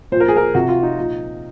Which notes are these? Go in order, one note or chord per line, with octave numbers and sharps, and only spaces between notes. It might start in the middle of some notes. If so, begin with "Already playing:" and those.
A#2 F3 C5
A#4
G#4
A#4
C3 F3 F#4
F4
D#4
A#2 F3